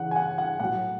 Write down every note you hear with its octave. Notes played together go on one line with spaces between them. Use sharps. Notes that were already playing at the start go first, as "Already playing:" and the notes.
Already playing: C#3 E3 F#5
G#5
F#5
F#5
A2 F#3 F#5